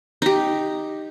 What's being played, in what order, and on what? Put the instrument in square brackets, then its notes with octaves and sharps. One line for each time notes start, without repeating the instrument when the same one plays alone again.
[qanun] D#4 G4